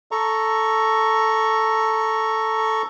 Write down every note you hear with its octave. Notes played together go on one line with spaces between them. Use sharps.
A4 A#5 C#6